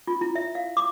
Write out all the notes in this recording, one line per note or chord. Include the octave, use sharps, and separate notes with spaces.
F4
E4
E5
F5
D6